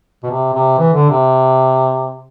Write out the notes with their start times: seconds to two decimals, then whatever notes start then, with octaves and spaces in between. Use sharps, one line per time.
0.24 B2
0.30 C3
0.54 C3
0.78 E3
0.94 D3
1.10 C3